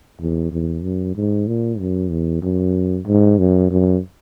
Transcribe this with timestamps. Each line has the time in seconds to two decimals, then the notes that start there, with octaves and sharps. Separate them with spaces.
0.20 E2
0.52 E2
0.84 F#2
1.16 G#2
1.48 A#2
1.79 F#2
2.11 E2
2.43 F#2
3.07 G#2
3.39 F#2
3.70 F#2